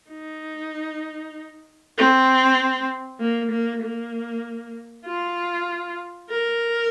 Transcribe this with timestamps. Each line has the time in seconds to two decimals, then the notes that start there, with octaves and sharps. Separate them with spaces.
0.10 D#4
1.97 C4
3.20 A#3
3.51 A#3
3.83 A#3
5.06 F4
6.30 A#4